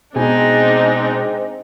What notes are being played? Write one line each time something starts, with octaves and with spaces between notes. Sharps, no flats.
B2 G#3 C4 D4 D#4 G#4 G#5